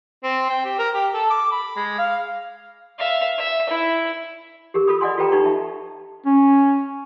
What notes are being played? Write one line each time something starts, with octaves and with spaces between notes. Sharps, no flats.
C4
G5
G4
A#4
G4
A4
D6
B5
G#3
F5
E5 F5
E5
E4
G4 G#4 A#4
F4 A4 B5 D#6
D5 D#5 F#5 G#5 C6
F4 G4 A4 B4 G5 A#5
D#4 G4 B4 A#5 C#6
E5 A5
C#4